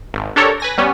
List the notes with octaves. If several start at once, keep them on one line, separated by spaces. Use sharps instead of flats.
G#1
D4 G4 A4 A#4 C#5
B4 G#5 A#6
G3 B3 C#4